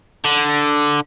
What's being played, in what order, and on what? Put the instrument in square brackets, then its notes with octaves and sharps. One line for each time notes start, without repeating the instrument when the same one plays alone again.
[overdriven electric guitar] D3